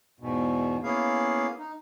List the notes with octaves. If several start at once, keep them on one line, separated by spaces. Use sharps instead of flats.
E2 G#2 B2
A#3 B3 C#4 E4 G#4 F5
D#4